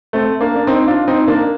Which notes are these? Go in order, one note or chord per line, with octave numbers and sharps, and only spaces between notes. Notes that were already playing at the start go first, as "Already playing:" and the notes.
A3 C4
A#3 D4
D4
C4 D#4
D4 F4
C4 D#4
A#3 D4